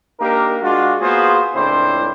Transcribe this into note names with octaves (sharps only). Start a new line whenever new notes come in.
A#3 D4 D#4 G4 A#4
G#3 D4 F4 F#4
A#3 B3 F4 F#4 G#4 C5
C#2 A2 C4 D4 E4 C5